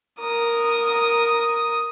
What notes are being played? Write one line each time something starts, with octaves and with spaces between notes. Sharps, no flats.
A#4 D#6